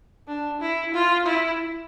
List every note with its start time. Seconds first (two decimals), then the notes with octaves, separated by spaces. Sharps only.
0.28 D4
0.61 E4
0.94 F4
1.26 E4